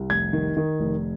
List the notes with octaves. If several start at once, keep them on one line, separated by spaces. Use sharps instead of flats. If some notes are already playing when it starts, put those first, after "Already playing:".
Already playing: C2
F1 G#6
D#3
D#3
F1